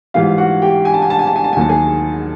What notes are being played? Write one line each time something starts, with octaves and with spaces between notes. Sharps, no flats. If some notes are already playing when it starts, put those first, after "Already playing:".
G#2 E3 G3 F4 F5
F#4 F#5
G4 G5
G#5
A5
G#5
A5
G#5
A5
G#5
A5
G#5
D#2 D#3 F#3 A5
G#4 G#5